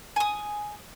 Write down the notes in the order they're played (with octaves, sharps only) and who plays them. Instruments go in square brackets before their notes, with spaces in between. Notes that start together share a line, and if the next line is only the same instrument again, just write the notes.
[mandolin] G#5 D#6